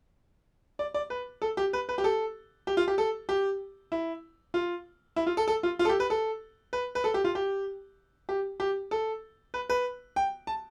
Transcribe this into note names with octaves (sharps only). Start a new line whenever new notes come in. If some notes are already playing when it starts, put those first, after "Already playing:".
D5
D5
B4
A4
G4
B4
B4
G4
A4
G4
F4
G4
A4
G4
E4
F4
E4
F4
A4
A4
F4
F4
A4
G4
B4
A4
B4
B4
A4
G4
F4
G4
G4
G4
A4
B4
B4
G5
A5